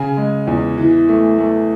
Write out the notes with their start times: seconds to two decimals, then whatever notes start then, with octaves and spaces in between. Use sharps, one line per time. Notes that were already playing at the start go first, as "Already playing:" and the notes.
Already playing: C#3 G#5
0.17 G#3
0.47 E2
0.78 E3
1.09 A3
1.39 A3